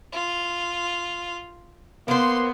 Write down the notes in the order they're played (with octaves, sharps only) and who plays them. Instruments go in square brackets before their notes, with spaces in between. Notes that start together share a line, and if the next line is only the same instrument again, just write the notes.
[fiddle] F4
[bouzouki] A#3 C5 [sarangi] B3 [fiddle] C6